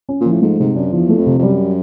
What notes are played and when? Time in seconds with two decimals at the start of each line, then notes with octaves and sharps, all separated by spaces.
0.09 C#4
0.20 A#2
0.26 F3
0.32 A2
0.42 G#2 A3
0.59 G#2 C3
0.75 F#2 D4
0.93 E2 F3
1.09 A3
1.18 F2
1.26 C3
1.39 F2
1.42 F#2 G3